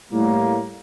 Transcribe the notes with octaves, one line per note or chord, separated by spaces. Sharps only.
A2 G3 A#3